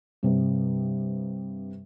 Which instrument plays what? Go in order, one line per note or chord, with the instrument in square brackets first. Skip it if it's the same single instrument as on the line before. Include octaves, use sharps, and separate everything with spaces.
[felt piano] G2 C3